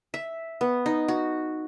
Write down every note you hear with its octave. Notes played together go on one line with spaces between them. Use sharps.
E5
B3
D#4
F#4